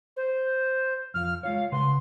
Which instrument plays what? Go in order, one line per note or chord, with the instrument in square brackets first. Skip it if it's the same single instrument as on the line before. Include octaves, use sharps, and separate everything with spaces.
[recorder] C5
[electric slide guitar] F2 F3 F5 [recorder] F6
[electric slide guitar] G#3 F4 C#5 [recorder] F5
[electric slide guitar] C#3 B4 F#5 [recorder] C6